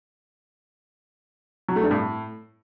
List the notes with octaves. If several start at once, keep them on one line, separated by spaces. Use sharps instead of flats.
F#3
A3
G2
A2